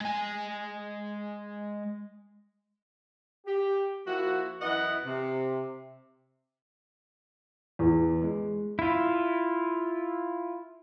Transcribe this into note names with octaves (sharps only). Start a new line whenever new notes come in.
G#3 G#5
G4
F3 A#3 E4 F#4
F#2 E3 B3 E4 D#5 F#5
C3
E2
G#3
E4 F4